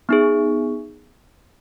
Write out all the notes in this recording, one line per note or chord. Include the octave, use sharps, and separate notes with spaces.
B3 D#4 G#4